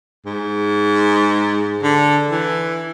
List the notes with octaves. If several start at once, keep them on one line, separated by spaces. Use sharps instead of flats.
G#2
D3
E3